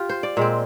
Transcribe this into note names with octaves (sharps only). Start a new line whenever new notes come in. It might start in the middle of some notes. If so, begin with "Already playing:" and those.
Already playing: F4 G4
C5
D5
A#2 G#3 C4